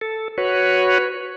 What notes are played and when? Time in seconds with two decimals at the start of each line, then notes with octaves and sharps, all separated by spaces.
0.01 A4
0.38 F#4 B4 C#5